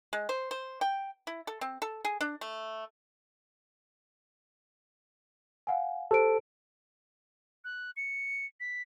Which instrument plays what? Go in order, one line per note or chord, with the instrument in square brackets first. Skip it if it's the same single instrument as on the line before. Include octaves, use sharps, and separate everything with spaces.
[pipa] G#3
C5
C5
G5
E4
A4
C4
A4
G#4
D4
A3
[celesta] F5 F#5 G#5
[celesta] G4 C5 D7 [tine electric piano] A4
[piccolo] F#6
C#7
B6